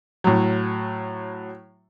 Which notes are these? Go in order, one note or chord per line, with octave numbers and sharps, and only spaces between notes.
A2 F#3